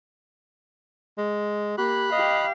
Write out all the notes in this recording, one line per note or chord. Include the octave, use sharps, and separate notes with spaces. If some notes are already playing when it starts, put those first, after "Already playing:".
G#3
A#3 G4 B5 F#6
G4 D#5 F5